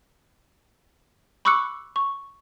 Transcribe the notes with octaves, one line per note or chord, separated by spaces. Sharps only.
B5 C#6 D6 E6 F#6 C#7
C#6